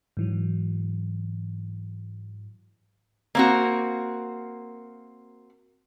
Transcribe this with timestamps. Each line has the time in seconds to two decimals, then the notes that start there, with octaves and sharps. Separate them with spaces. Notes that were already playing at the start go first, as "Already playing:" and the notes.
0.17 G#2 E3 F#3
3.35 A#3 C4 F#4